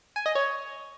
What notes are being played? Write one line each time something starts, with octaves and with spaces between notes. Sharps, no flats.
G#5
D#5
C#5